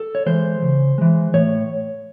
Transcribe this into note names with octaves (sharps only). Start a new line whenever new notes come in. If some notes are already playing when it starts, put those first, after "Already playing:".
Already playing: A4
C#5
E3 G#3 C5
C#3
E3 G#3
A2 C#5